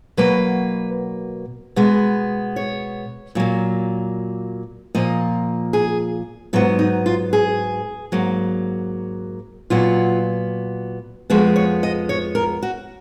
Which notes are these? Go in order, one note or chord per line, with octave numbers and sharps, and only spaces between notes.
B2 F#3 A#3 B4
B2 G#3 B3
C#5
A#2 F#3 A#3
A#2 F3 A#3 D#5
G#4
G#2 F#3 B3 F4
D#4
F4
G#4
G#2 F#3 A#3
A#2 F#3 B3 F4
F2 F3 G#3 B3 F#4
C#5
D#5
C#5
A#4
F#4